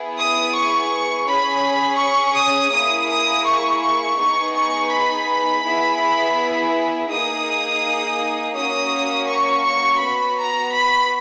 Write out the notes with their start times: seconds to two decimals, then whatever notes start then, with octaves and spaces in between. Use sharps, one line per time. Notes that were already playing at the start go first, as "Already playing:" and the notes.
Already playing: B3 E4 G#4
0.18 D#6
0.54 C#6
1.27 C#4 G#4 B5
1.99 C#6
2.37 D#6
2.73 A#3 E4 G#4 D#6
3.09 D#6
3.46 C#6
3.82 C#6
4.18 B3 D#4 G#4 C#6
4.55 C#6
4.91 B5
5.64 B3 E4 G#4
7.10 A#3 D#4 G#4 D#6
8.55 A#3 C#4 F#4 D#6
9.29 C#6
9.65 C#6
10.01 B3 F#4 B5
10.38 A#5
10.74 B5